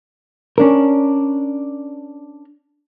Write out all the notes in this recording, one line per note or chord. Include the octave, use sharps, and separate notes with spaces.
C#4 D4 A#4